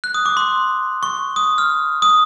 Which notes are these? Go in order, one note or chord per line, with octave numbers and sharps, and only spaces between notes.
F#6
D#6
D6
C6
C#6
D#6
F6
D#6